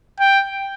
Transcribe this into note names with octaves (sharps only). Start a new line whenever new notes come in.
G5